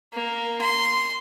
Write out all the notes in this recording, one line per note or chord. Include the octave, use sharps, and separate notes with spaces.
A#3
C6